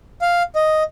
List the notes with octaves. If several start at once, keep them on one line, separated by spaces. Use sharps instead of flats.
F5
D#5